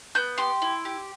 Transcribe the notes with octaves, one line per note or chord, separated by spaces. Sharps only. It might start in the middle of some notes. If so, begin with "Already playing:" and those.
B3 G6
G4 C6
E4
G4